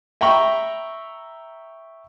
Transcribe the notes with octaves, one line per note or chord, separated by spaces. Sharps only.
E5 G5 A#5 B5 C#6